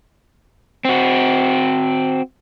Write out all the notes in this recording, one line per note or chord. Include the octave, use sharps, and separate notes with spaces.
C4 F#4